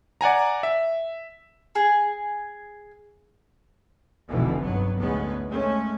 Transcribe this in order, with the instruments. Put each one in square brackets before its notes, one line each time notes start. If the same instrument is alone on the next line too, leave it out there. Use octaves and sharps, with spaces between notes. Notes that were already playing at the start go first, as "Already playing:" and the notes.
[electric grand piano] D5 F#5 G#5 A#5
E5
[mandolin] G#4
[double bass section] F1 B1 B2 D3 E3
G2 F#3 B3
A1 D2 G#2 G#3 B3 C#4
G#3 A3 C#4